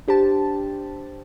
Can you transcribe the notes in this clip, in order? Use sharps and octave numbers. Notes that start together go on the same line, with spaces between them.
D4 G4 C5 A5